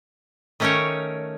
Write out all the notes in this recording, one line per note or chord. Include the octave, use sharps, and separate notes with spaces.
D#3 A3 C#4 D#4 A#4 C#5